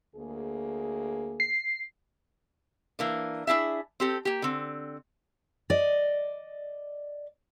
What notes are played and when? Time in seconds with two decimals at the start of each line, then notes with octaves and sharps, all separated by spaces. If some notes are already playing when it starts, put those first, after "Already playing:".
0.16 D2 A#3 G#4
1.40 C7
2.99 E3 A#3 D4
3.47 D4 E4 G#4 E5
4.00 C4 G4 A4
4.25 A#3 G4
4.42 D3 C4
5.70 D5 D#5